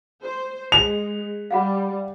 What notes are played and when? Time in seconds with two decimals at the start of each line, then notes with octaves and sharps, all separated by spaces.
0.22 C5
0.72 G#3 F7
1.51 G3 F5 F#5 B5